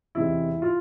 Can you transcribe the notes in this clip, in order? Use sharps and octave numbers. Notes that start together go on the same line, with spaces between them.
E2 C3 E3 G#3 E4
F4